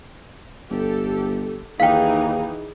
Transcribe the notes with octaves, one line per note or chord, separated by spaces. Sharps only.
G1 G4 A4
D#2 E3 D#4 G#4 F5 G5